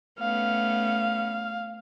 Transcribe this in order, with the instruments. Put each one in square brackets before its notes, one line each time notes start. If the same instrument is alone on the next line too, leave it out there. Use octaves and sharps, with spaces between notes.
[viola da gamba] A3 B3 C#4 [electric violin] F5